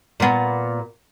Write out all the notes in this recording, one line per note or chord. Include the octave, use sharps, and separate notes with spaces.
A#2 B3